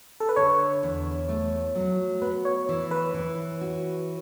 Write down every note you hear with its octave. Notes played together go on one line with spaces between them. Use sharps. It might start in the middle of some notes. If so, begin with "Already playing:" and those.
A4
B4
D3 C#5
E2
A3
F#3
B3 B4
C#5
E3
B4
E3
F#4